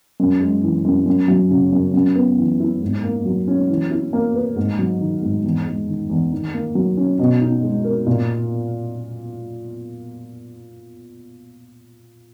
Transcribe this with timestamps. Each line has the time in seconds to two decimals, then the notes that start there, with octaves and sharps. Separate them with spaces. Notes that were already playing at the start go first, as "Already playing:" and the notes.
0.20 F#2
0.41 G#3
0.62 E3
0.85 F#2
1.06 F#2
1.28 F#3
1.51 C#3
1.73 F#2
1.94 F#2
2.16 B3
2.37 E3
2.60 E4
2.82 G#2
3.04 A#3
3.25 F#3
3.47 C#4
3.69 E3
3.91 E4
4.13 A#3
4.35 B4
4.56 G#2
4.79 F#3
5.01 D#3
5.23 G#2
5.44 E2
5.66 G#3
5.89 D#3
6.10 E2
6.31 D#3
6.54 A#3
6.75 F#3
6.97 C#4
7.19 B2
7.41 D#4
7.63 G#3
7.84 A#4
8.06 A#2